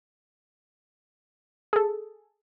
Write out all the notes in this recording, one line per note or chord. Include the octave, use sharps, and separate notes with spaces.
G#4 A4